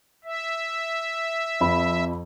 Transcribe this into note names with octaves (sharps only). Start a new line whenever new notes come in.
E5
F2 B5